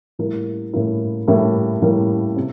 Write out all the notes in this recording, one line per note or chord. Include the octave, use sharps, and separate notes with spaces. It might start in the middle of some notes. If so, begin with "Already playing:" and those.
A2 G3 A#3 E4 A#4
A2 G3 A#3 E4 A#4
A2 G3 A#3 E4 A#4
A2 G3 A#3 E4 A#4
C3